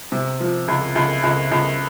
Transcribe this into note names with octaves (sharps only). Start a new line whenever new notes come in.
C3
F3
C#2
C#2
C#2
C#2